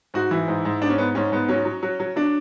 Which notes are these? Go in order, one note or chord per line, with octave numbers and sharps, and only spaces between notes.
G#2 F#4
E3 E4
G#2
G#2
G#2 D4
C#4
G#2 B3
G#2 C#4
G#2 B3
F#3 C#4
F#3
F#3
F#3
F#3 D4